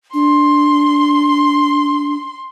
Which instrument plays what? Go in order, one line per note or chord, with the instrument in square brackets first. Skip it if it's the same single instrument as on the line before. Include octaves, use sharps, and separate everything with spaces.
[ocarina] D4 [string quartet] C6